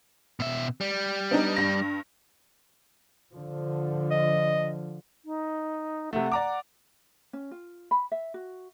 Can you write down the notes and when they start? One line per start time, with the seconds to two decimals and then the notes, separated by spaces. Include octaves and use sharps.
0.40 B2 E5
0.81 G3
1.31 B3 D4 D#4
1.57 G2 A#6
3.31 D3 F3
4.10 D#5
5.25 D#4
6.13 C3 A3 F#5
6.32 D5 A#5 D6
7.33 C#4
7.51 F4
7.91 B5
8.12 E5
8.34 F#4